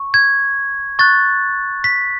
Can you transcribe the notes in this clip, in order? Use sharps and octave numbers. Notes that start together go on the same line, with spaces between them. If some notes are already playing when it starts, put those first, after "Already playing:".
Already playing: C#6
G#6
C#6 F#6 A6
B6